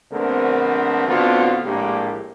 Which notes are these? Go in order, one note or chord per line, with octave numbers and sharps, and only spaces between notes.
A#1 D3 A3 B3 C4 A#4
A2 D3 B3 C4 F4 F#4
A#1 A2 G#3 A#3 D4 G4